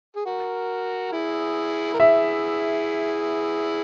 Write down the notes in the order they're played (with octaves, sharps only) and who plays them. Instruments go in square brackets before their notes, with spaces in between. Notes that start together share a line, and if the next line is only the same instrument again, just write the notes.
[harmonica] G#4
F#4 A#4
E4 G#4
A#4
[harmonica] E4 G#4 [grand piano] E5